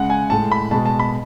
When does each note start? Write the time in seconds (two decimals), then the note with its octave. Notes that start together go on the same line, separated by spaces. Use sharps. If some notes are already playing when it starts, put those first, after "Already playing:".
Already playing: C#3 G#3 F#5
0.10 G#5
0.30 A2 G#3 A5
0.52 B5
0.71 B2 G#3 A5
0.86 A5
0.99 B5